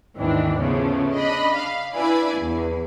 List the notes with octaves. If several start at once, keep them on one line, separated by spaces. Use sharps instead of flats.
D#2 G#2 D#3 E3 C4 D4
C#3 F3 A3 B3
D4 D#5 B5
F5
D4 E4 B4 D5 G#5 B5
E2